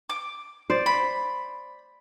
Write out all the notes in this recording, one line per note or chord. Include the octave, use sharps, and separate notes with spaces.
D6
C5 D5
B5